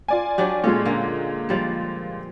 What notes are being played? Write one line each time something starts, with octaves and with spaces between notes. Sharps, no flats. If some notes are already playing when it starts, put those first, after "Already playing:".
F4 D5 G#5
F#3 D4 G4
A#2 G#3 C#4 A4
D3 A#3
F3 G3 C5